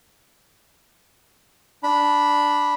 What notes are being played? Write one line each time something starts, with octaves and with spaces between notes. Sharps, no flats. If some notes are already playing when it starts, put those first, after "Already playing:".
D4 B5